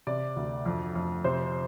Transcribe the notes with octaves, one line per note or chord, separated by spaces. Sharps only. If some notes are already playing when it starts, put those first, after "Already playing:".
C3 D5
D2
F2
F2
C3 C5